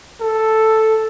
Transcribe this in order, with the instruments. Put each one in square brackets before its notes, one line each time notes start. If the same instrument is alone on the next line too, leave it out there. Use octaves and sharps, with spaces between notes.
[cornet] A4